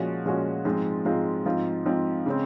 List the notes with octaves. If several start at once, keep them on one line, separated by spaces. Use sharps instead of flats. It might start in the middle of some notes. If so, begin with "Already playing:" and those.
Already playing: A#2 F3 G#3 C#4 F#4
A#2 F3 G#3 C#4 F#4
G#2 F3 G#3 C4 F4
G#2 F3 G#3 C4 F4
G#2 F3 C4 F4
G#2 F3 C4 F4
C#3 G#3 C4